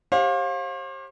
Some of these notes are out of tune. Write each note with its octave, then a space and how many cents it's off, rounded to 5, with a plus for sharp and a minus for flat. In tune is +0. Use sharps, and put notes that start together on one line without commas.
G4 +0 C5 +45 F5 +25